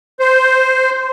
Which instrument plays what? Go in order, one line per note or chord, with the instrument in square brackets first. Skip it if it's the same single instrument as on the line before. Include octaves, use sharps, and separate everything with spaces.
[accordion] C5